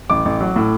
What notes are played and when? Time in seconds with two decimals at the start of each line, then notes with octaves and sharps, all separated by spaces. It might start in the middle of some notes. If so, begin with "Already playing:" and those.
0.10 A1 D6
0.25 A1
0.41 F#3
0.56 A2